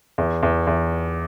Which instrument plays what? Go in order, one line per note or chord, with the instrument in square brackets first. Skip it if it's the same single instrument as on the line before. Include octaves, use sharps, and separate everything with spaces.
[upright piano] E2
E2
E2